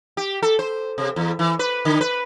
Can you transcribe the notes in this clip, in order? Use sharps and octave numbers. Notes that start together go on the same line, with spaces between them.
G4
A4
C5
C3
E2
E3
B4
D3
B4